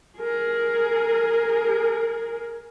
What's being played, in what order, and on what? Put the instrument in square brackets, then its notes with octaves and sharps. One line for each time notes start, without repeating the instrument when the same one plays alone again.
[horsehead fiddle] G#4 A#4